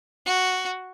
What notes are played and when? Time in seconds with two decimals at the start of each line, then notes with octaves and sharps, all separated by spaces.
0.26 F#4